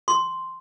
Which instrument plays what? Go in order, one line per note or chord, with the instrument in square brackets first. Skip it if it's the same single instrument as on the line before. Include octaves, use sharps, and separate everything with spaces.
[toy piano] C6